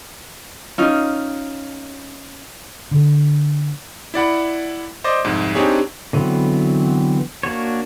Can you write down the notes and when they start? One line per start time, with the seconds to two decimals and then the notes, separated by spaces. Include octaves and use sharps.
0.78 C#4 D#4 F4
2.91 D3
4.14 E4 D5 F#5 B5
5.04 C5 D5 D#5 D6
5.25 C2 F2 G#2
5.55 C4 D4 D#4 G4 G#4 C#5
6.13 D3 E3 F#3 B3 C4
7.43 A#3 D4 F#4 C#5